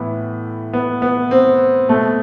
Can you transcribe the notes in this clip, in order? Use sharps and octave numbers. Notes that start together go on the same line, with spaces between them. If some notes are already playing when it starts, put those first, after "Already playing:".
Already playing: A2 E3 B3
B3
B3
C4
B2 A3